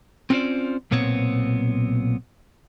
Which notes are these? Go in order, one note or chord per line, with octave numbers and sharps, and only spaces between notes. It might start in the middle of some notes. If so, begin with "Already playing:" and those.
C4 C#4 F4 A#4 C5 D5
B1 A#2 B3 C4 C#5